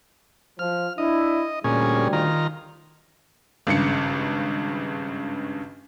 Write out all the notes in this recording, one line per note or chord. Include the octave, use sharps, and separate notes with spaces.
F3 F6
D4 E4 D#5
D2 A#2 G3 C#4 G#4
D#3 F4 A#5
G#1 G2 C#3 C#7